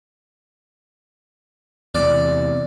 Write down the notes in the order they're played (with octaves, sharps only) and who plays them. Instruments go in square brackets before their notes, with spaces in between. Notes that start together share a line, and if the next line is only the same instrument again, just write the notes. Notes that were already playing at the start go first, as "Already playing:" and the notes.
[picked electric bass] E2 C3 [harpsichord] D5